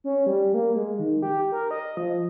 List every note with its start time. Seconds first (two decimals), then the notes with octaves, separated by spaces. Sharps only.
0.04 C#4
0.26 G3
0.54 A#3
0.76 G#3
0.99 D#3
1.22 G4
1.52 A#4
1.71 D#5
1.97 F3